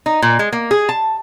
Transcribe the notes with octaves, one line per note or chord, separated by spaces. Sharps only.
D#4
A#2
G#3
A#3
G#4
A5